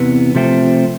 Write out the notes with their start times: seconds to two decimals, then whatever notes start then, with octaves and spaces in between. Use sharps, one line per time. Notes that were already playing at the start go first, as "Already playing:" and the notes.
Already playing: E2 C3 E3 B3
0.35 C3 F3 A3 C4